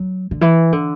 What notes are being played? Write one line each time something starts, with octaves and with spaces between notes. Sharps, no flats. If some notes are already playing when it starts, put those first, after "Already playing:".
Already playing: F#3
D3
E3
D3